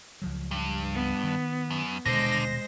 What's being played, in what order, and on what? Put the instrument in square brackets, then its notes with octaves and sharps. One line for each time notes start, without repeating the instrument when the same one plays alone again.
[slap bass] C#2 F3 F#3
[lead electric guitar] G2
[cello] B3
[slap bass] D#3
[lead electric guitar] F#2
[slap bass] D#1 B2 [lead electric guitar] D3 [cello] G#3 C5 [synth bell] A#6